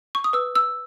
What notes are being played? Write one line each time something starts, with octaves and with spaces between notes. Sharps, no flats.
C#6
D#6
B4 E6
E6